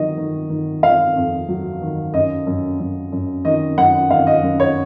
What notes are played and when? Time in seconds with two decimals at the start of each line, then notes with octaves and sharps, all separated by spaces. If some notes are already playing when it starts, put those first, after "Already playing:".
Already playing: D#3 F#3 D#5
0.18 D#3
0.50 D#3
0.83 D#3 F5
1.16 F2
1.49 F#3
1.81 D#3
2.14 F#2 D#5
2.47 F#2
2.79 F#2
3.12 F#2
3.45 D#3 D#5
3.78 F#2 F#5
4.10 D#3 F5
4.27 D#5
4.43 F#2
4.60 C#5